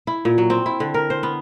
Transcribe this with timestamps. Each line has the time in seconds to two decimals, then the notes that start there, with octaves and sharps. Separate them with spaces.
0.07 E4
0.25 A#2
0.38 F#3
0.50 C4
0.66 E4
0.80 D3
0.94 A#4
1.10 C5
1.23 B3